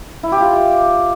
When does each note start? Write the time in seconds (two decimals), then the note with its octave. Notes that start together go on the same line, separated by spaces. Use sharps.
0.23 E4
0.32 G4
0.41 F4